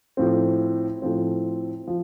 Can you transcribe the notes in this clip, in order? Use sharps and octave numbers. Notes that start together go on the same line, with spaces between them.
A2 F3 C4
A2 F3 C4
F3